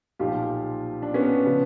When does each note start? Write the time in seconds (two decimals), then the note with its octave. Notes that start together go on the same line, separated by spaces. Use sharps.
0.19 B1 A#2 F3 F4 G4
1.03 D4
1.14 B3 C#4
1.46 C#3 F3